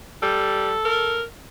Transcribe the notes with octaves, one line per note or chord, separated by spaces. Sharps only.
G3 A4
A#4